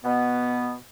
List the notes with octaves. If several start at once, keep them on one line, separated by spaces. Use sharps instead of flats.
B2 B3